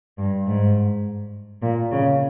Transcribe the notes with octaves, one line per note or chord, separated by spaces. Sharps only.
G2
G#2
A#2
C#3